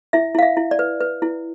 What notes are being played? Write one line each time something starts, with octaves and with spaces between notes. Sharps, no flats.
E4 E5
E4 F5
E5
E4
D5
B4
B4
E4